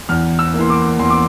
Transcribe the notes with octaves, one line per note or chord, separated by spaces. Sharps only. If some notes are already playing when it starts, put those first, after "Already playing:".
E2 F6
E6
A#3
E3 C6
D6
E2 C6
D6